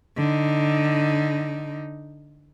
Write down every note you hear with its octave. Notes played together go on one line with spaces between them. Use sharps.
D3 D#4